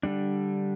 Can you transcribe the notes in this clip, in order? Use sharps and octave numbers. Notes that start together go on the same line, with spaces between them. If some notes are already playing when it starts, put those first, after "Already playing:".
D3 G3 D4